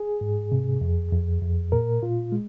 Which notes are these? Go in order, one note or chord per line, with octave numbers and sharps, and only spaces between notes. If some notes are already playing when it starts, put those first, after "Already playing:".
Already playing: G#4
G#2
C3
F2
F2
F2
A#2 A#4
A#2 F4
G#3